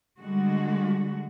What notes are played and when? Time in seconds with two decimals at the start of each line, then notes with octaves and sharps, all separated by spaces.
0.21 D3 G3 G#3 F#4